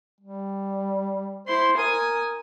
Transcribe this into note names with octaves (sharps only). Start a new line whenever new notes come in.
G3
E4 C5 C6
A#4 G#5 D#6